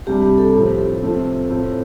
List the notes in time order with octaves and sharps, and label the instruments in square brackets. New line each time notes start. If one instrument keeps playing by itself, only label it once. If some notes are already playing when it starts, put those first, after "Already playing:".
[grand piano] C2 C3 G3 D4 [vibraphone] G4
[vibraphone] G4
A4
[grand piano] A2 F3 C4 [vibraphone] G4
[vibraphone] A4
[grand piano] C3 F3 A3 C4
A2 A3 C4 F4